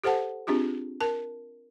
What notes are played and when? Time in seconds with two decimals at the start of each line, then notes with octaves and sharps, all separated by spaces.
0.04 G4 A4 C5 F#5 A5
0.47 C4 D4 F4 G4 G#4
1.01 A#4 A5